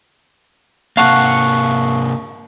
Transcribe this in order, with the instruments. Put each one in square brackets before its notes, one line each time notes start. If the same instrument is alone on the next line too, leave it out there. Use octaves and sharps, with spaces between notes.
[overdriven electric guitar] C3 A#3 [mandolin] F5 F#5 [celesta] A5 C#6 C7